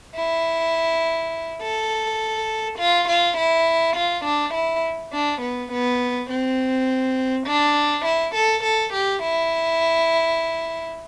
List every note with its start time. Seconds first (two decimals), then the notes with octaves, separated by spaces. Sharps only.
0.15 E4
1.62 A4
2.79 F4
3.08 F4
3.37 E4
3.96 F4
4.25 D4
4.54 E4
5.13 D4
5.42 B3
5.72 B3
6.30 C4
7.47 D4
8.05 E4
8.35 A4
8.63 A4
8.94 G4
9.23 E4